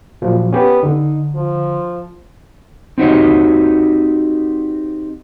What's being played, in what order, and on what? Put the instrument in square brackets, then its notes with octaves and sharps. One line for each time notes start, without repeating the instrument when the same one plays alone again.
[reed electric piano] A#2 F3 F#3
[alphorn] B3 [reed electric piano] C#4 G4
[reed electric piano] D3 [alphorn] D#4
[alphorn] F3
[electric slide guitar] C4 D#4 F#4 G4 C#5 D#5